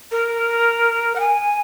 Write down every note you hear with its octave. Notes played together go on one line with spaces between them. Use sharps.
A#4
F#5
G#5